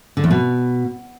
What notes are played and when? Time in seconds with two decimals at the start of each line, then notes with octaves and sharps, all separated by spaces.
0.17 D3
0.24 E2
0.31 B2